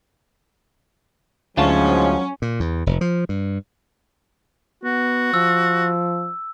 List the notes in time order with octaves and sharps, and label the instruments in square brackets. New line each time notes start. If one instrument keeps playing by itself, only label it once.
[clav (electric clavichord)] D2 F4 A5 [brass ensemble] G#2 F3 [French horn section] F#3 [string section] C#4
[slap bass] A#2
E2
F1
F3
G2
[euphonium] B3 [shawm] F#4
[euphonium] F3 [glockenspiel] E6